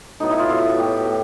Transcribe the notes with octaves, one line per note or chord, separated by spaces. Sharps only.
A2 F#3 B3 D#4
E4
F4
A2 F#3 B3 E4
F4
F#4
A2 F#3 B3 G4
A2